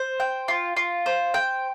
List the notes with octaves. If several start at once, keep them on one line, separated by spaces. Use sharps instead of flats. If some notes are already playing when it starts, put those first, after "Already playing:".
Already playing: C5
G5
F4
F4
C5
G5